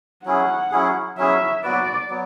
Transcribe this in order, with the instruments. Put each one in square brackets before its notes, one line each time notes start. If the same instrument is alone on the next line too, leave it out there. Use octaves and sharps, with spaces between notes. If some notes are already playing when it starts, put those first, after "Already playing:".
[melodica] F#3 C#4 E4 G#4 [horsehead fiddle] F#5
[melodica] F#3 C#4 E4 G#4
[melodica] F#3 C#4 E4 G#4 [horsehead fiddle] E5
[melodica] F#3 B3 F#4 B4 [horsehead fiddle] D5
[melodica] F#3 B3